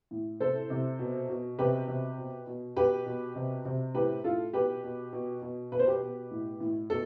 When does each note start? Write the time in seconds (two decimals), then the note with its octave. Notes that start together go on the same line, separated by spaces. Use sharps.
0.11 A2
0.40 C3 A4 C5
0.70 C3
0.99 B2
1.29 B2
1.59 C3 G4 B4
1.88 C3
2.18 B2
2.47 B2
2.76 B2 G4 B4
3.06 B2
3.35 C3
3.65 C3
3.95 A2 G4 B4
4.24 A2 F4 A4
4.53 B2 G4 B4
4.84 B2
5.13 B2
5.42 B2
5.72 B2 B4
5.79 C5
5.87 G4 B4
6.02 B2
6.31 A2
6.60 A2
6.90 B2 A4